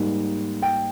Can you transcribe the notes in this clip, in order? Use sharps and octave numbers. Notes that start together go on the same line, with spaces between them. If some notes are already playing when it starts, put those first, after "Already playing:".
Already playing: G#2 G3 A#3
G5